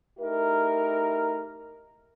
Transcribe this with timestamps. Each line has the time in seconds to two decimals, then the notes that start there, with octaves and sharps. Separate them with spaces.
0.20 A3 D#4 E4 G4 A#4